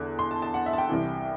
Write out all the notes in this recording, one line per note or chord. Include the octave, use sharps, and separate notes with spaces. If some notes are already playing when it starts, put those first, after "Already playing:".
Already playing: E2 D3 F#6
C6
A5
A5
F#5
E5
A5
G5
C2 C3 E3